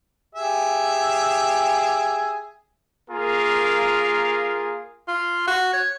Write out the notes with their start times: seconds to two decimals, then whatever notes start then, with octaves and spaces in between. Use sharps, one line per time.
0.35 G4 G#4 E5
3.10 A#3 F4 G#4 A#4
5.08 F4
5.47 F#4
5.73 C#5